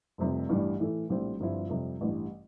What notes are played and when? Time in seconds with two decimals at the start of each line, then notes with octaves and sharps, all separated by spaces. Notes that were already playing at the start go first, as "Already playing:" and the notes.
0.18 F1 F2 C3 G3
0.49 A1 G2 E3 G3
0.80 A2 E3 A3
1.09 A#1 A2 G3 C4
1.40 G1 G2 F3 C4 E4
1.69 F2 C3 G3
2.01 A1 G2 E3 G3